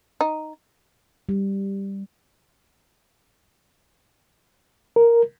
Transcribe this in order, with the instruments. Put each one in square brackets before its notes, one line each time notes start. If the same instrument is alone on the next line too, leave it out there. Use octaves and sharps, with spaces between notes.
[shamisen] D#4
[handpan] G3
[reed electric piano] A#4